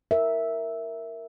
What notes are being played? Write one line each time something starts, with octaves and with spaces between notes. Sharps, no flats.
A#4 E5